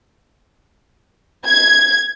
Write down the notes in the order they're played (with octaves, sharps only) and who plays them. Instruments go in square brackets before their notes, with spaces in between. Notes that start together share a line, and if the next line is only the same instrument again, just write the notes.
[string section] G#6